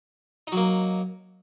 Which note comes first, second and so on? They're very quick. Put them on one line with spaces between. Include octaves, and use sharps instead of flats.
D#4 F#3 A#3